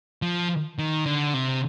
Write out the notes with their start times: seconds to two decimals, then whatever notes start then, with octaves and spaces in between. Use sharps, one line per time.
0.22 F3
0.78 D#3
1.06 D3
1.34 C3